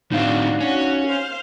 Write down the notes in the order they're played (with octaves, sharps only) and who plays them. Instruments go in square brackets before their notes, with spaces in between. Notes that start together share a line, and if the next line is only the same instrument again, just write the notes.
[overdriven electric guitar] A2 C4 [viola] D4 F#4 [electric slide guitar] D#4 F5
[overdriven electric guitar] C#4 [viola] F#4
[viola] C5 F5